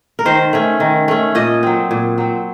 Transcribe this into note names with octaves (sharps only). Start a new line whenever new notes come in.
A#4
D#3 C5
A3 C#4
D#3
A3 C#4
A#2 D#5
F#3 C4
A#2
F#3 C4